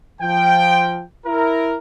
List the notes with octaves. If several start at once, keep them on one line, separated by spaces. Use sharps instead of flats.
F3 G5
E4 A#4